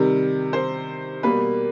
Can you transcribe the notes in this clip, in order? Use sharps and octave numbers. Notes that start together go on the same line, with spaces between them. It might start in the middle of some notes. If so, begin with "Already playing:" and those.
Already playing: C3 D#3 G3
C5
B2 G3 A#3 B4